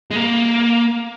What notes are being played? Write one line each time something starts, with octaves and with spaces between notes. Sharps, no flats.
G#3
A#3